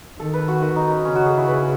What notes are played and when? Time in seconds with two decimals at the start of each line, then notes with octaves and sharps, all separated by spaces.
0.19 D#3 A4
0.34 B4
0.48 F#4
0.62 F#4
0.76 D#4
0.90 C#4
1.05 C#3 C#4
1.15 F#4
1.26 G#4
1.37 E4
1.48 B4